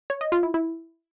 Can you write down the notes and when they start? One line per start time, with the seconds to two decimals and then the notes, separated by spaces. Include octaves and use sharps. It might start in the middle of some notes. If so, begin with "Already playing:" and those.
0.10 C#5
0.21 D#5
0.32 F4
0.43 E4
0.54 E4